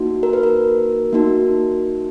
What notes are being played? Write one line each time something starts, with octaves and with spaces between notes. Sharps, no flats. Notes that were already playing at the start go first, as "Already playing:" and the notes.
Already playing: A#3 D#4 F#4
A#4
B4
A#4
A#3 D#4 F#4